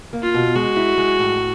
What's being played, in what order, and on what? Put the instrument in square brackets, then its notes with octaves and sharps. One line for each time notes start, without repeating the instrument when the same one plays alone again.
[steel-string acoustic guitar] A#3
[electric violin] F4
[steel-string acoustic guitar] B2
[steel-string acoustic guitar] G#3 [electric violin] F#4
[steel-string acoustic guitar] E4
G#3
A2